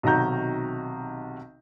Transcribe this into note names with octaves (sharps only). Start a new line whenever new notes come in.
B1 C3 D#3 F#4 A#5 G6